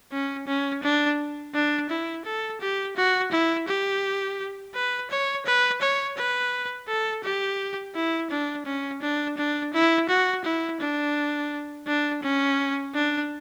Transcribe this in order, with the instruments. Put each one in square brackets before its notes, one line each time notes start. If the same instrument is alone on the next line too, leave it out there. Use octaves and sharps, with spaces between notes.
[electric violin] C#4
C#4
D4
D4
E4
A4
G4
F#4
E4
G4
B4
C#5
B4
C#5
B4
A4
G4
E4
D4
C#4
D4
D4
E4
F#4
E4
D4
D4
C#4
D4